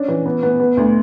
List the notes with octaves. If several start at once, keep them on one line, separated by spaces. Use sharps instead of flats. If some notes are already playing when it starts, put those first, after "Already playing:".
Already playing: C#4 D4
E3
B3
B3
B3
D2